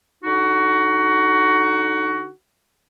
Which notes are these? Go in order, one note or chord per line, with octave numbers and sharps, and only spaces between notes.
D3 D#4 F#4